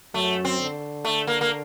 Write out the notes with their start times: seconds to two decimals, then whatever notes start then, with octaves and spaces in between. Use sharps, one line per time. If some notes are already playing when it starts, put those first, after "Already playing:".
0.14 F#2 F#3 A3
0.45 C4
0.60 D3
1.05 A3
1.27 A#3
1.41 A#3